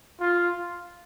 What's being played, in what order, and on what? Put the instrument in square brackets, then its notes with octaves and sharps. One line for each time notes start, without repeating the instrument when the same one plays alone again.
[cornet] F4